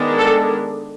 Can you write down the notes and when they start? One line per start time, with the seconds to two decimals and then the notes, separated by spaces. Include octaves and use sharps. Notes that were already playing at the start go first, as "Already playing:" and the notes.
Already playing: D#3 G#3 B3 D4
0.18 A4